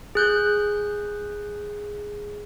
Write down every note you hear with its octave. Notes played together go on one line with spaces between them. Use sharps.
G#4 F#6 G6